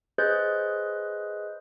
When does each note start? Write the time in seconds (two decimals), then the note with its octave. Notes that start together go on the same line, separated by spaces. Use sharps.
0.18 G#4 B4 C5 D#5 F#6 G6